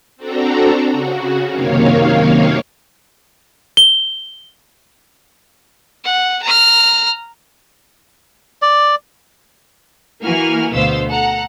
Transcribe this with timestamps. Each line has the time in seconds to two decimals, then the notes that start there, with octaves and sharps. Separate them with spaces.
0.17 C4 D4 F#4 A4 A#5
0.91 C#3 F#4
1.48 F#2 C3 D#3 A#3 C#5 F5
3.77 G7
6.04 F#5
6.43 A#5 F6
8.62 D5
10.22 E3 A#3 F#4 G#5 F6
10.72 D2 B2 B3 C5 F5 E6
11.08 A4 F#5 A#5